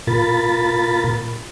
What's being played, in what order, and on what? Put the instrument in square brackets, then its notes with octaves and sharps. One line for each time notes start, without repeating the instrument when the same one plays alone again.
[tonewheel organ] A#2 F4 A#4 B5 A6